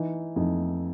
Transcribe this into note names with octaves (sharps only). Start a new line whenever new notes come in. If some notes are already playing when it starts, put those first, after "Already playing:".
Already playing: E3 D#4
F2 D#4